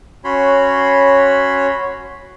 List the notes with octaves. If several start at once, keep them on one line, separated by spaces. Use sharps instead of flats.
C#4 F#4 C#5 B5 C6